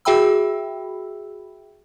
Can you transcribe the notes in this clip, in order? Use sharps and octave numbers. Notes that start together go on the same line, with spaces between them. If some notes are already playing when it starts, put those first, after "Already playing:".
F#4 G#4 E5 G5 B5 E6